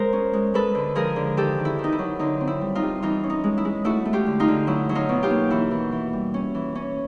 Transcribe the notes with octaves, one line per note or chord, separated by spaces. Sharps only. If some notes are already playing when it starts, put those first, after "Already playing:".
Already playing: G#3 A#4 C5
C#4
G#3
G#3 A4 B4
D3
F3 G#4 A#4
D3
D#3 G4 A4
D#3
E4
D#3
D#4
E4
F#3
D3 D#4
C4
E4
G3
D#4 F4
G3
E3 D#4 F4
C#4
D#4
G#3
E4
G#3
A3 E4 F#4
A3
F4 G4
D3
D#4 F4
D3
F#3 E4
F#3
D#4 F4
B2
F4 G4
A#3
E3 E4 F#4
E3
E3
G3
C#4
E3
C#4